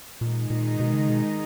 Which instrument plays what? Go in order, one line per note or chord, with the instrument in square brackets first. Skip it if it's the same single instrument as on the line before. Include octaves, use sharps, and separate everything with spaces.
[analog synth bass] A#2 [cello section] D#3 G#3 D#4
[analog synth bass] A#2
B2
C#3
B2